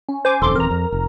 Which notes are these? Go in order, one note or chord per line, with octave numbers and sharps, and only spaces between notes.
C#4
C5 G#5 D6
D#1 F2 A4 C6 D6
D#1 E3 C4 A#4 A#5
F2
F1